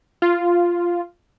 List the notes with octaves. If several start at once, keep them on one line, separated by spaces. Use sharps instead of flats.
F4